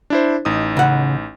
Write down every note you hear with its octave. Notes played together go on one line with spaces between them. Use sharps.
D4 E4 C5
A1 D#4 D#6
C#3 F#5